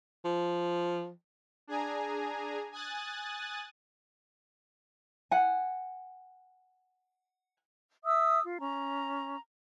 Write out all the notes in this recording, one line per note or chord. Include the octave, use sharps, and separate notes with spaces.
F3
D4 G#4 G#5 A#5
G#5 D#6 F#6 A6
F#5 G#5
E5 D#6 E6
F4
C#4 A#5